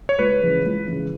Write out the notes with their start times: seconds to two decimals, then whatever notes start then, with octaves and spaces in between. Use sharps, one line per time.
0.09 C#5
0.19 C#2 B4
0.43 C#3 E3
0.65 C#2
0.88 C#3 E3